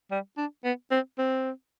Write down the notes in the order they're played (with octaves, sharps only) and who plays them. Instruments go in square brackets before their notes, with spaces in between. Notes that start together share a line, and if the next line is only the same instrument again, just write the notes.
[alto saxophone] G3
D4
B3
C4
C4